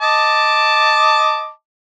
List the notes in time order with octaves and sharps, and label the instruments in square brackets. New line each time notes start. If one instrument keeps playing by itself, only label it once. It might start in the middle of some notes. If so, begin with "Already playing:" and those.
[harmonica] D#5 A5 D6